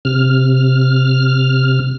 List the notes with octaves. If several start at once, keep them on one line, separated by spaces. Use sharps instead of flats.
C3 F6